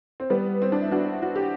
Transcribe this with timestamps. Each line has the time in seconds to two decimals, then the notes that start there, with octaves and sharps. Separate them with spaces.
0.20 C4
0.30 G3 B3
0.62 C4
0.72 D4
0.81 E4
0.91 D4 F#4
1.22 F#4
1.36 G4